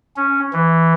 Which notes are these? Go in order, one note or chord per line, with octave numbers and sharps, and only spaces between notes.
C#4
E3